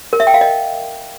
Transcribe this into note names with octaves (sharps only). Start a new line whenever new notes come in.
A#4
E5
G5
F5
D#5